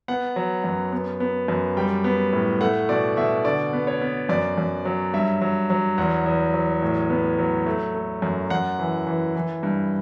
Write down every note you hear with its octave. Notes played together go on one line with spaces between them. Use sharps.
B3 F#5
F#3
F#2
B3
B3
F#2
G3 G5
B3
A2
A3 F#5
B2 D5
B2 E5
D3 D5
B3
C#5
B3
F#2 D5
F#2
F#3
G2 E5
F#3
F#3
E2 F#5
E2
F#3
A2
B3
F#3
A3
A3
F#2
F#2 F#5
E3
E3
E3
G2